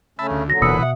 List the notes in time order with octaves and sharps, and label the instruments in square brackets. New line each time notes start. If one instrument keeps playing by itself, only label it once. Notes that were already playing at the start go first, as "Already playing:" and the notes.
[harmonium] C#3 A3 C#4 [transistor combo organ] E5 A5 B5
[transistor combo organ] D2
[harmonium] A#2 D3 F#3 [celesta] F#4 A#6
[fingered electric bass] D#1 B2 A#3 [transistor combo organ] E3 B4 [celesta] D#6 E6 C#7
[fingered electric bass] B2 [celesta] E5 D#6 [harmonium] F#5